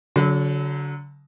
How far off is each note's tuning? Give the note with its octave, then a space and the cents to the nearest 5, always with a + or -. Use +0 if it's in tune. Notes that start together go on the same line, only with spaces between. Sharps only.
D3 -40 F#3 +0